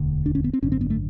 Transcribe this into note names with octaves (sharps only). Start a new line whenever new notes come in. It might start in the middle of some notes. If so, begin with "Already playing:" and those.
Already playing: E1 D2 D3
D4
C#4
B3
C4
G#1 F#2 D3 C#4
C4
B3
A3